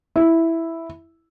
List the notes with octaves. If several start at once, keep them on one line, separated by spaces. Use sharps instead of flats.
E4